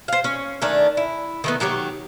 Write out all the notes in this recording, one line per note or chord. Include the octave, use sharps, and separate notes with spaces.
C5 F5
C#4
D#3 A3 C#4 D4
E4
D#3 A3 B3
D#3 F#3 G4 C#5